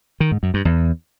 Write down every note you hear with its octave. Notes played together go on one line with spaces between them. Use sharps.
D#3
G#2
F#2
G2
E2